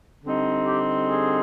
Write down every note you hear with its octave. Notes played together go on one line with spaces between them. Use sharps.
D3 G3 C4 D#4
G4
G#4